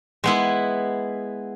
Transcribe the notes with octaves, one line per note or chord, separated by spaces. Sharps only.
G#3 B3 E4